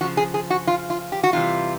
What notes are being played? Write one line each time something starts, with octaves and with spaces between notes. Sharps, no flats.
C#3 F3 F#4
G#4
G#4
F#4
F4
F4
G4
F#4
C3 E3 G3 F4